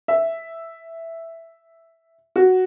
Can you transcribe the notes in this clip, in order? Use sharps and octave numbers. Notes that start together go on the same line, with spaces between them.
E5
F#4